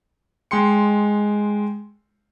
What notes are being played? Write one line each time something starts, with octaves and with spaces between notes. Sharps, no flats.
G#3 G5 C6 C#7